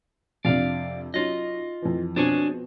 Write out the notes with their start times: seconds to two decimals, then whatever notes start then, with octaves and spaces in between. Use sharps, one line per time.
0.45 F2 C3 D4 D5 F5
1.14 F#3 C#4 D#4 F4 D#5
1.82 F2 E3
2.16 B2 F3 C4 D4 G#4 C#5